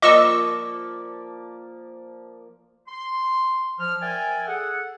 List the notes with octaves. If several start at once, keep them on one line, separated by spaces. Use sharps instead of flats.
F3 A#3 D5 D#5 C#6 D6 E6
C6
F3 F6
A#4 D5 E5 G5 G#5
G#4 A4 F#5